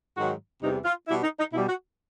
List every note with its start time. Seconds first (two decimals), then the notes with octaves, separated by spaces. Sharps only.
0.16 G#2 D#3 F#3 F#4
0.62 E2 C3 E3 G3 D#4
0.84 F4
1.07 B2 G3 E4
1.22 D#4
1.38 D#4
1.52 B2 E4
1.56 G3
1.67 F#4